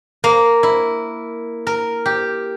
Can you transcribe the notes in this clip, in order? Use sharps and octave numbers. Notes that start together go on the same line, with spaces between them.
A#3
E4
A#4
G4